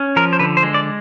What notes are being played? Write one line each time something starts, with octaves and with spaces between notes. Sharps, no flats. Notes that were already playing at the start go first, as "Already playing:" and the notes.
Already playing: C#4
F3 A#4
C5
D3 B4
C5
G#3
D5